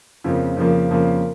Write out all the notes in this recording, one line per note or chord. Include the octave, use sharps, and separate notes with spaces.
F2 C#3 F3 A#3
F2 C#3 F3 A#3
F2 C#3 F3 A#3